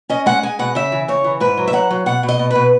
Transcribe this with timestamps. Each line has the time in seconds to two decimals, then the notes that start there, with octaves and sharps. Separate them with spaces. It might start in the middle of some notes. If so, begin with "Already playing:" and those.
0.09 C#4 D#5
0.26 G#3 F#5
0.43 G#3 G#5
0.59 B2 F#5
0.75 C#3 E5
0.92 E3
1.08 C#3 C#5
1.24 E3
1.40 G#2 B4
1.57 F#3
1.68 E5
1.73 F#3 F#5
1.91 F#3
2.06 B2 F#5
2.23 B2
2.29 D#5
2.39 B2
2.51 B2 B4